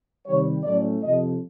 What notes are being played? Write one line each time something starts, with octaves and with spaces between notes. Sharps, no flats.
C3 D#3 G3 C#5
A2 F#3 A3 C#4 D5
F2 C3 F3 D#5